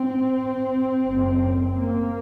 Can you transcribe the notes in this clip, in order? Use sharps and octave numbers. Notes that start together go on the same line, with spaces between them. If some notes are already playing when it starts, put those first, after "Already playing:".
Already playing: C4
F#1 F#2
A#3